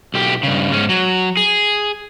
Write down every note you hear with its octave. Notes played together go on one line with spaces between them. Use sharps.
B1 G4
G2 C#3
G#2 C#4
F#3
G#4